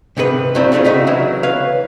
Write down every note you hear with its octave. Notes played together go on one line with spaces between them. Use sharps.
G#2 C3 D#3 F#4 B4
G2 D#3 E3 F#3 C4
E2 C#3 A3 D4 F4
C#3 A3 D#4 F#4
C#3 E3 F#3 G#3 E4
B4 C#5 F5